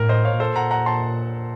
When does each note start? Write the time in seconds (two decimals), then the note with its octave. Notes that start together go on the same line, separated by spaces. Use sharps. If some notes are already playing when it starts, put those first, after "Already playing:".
Already playing: A2 A#4
0.09 C5 D#5
0.25 C#5 F5
0.40 A#2 A4 C5
0.56 F#5 A#5
0.71 F#5 A#5
0.86 A5 C6